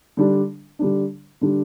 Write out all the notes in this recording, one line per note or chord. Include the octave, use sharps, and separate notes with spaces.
D3 G3 D4
D3 G3 D4
D3 G3 D4